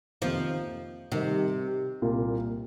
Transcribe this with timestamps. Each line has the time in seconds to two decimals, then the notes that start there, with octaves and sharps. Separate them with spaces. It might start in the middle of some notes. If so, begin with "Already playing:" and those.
0.21 F2 C3 D#3 F3 A#3 D#4
1.12 C3 D#3 G3 D#4 A#4 D#5
2.02 C2 A#2 A#3 F4